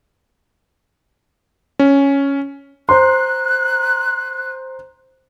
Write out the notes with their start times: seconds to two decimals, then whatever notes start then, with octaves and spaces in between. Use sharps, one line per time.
1.79 C#4
2.89 C5 A#5 C6 F#6